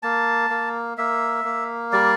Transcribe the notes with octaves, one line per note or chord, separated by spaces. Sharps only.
A#3 A5
A#3
A#3 E5
A#3
G3 D5